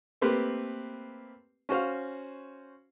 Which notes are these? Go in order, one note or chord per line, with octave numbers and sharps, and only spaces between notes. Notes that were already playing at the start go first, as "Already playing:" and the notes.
A3 A#3 C4 G4 B4
C#4 F#4 C5 F5